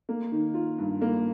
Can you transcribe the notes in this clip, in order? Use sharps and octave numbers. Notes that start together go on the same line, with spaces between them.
A#3
D#3
F4
G2
A#3